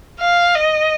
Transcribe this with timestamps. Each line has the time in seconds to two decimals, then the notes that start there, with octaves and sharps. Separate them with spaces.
0.20 F5
0.55 D#5